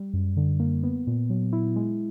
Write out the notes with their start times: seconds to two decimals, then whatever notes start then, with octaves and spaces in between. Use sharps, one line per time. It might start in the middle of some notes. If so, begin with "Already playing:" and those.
Already playing: G3
0.13 F#2
0.37 D3
0.60 A#3
0.83 B3
1.07 A#2
1.30 F#3
1.53 E4
1.76 G#3